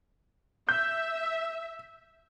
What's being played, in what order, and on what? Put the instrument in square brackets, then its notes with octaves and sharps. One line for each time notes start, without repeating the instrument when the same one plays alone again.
[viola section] E5 [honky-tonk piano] G6